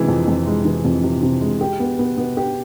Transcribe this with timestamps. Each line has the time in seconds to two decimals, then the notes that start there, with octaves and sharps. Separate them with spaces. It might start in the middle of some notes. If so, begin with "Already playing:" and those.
Already playing: C3 E3 G#3
0.08 F2
0.28 F2
0.47 G#3
0.65 E3
0.85 F2
1.04 C3
1.22 C3
1.41 G#3
1.61 G4
1.80 B3
1.99 B3
2.17 B3
2.37 G4